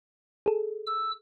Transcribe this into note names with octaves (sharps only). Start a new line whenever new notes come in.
G#4 A4
E6